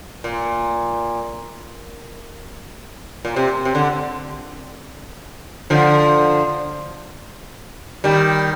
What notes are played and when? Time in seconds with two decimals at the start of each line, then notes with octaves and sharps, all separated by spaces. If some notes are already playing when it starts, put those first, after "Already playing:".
0.24 A#2
3.25 A#2
3.36 C3
3.65 C3
3.75 D3
5.70 D3 F3
8.04 D#3 G3